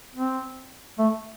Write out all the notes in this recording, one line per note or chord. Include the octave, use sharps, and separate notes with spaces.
C4
A3